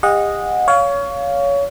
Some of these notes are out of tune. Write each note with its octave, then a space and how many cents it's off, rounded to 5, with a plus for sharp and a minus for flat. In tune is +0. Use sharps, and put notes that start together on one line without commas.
G4 +45 D#5 +0 F#5 -25
C#5 +25 F5 +0